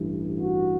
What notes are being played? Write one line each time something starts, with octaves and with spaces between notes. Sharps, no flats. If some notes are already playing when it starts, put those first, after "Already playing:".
Already playing: A1 G2 E3
F#4